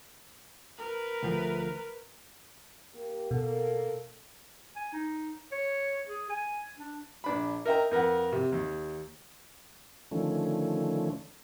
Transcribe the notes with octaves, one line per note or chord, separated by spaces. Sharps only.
A#4 B4
D2 F3 A3
A#3 G4
B2 A#3 A4
G#5
D#4
C#5
G#4
G#5
D4
A#1 D4 B5
A#4 D#5 E5 G5 A#5
F2 A#4 B4 F#5
C3
D#2
D3 D#3 F3 A3 C#4